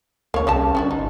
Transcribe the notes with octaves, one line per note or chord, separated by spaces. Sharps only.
D2 A#3 C#5
C2 C#3 G4 A5
G1 C#4 D4 F#4
D#4